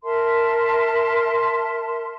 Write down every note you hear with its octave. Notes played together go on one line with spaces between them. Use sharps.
A#4 E5 A5 C6